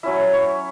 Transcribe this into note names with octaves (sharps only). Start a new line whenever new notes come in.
F#3 C#4 E4 E5
C#5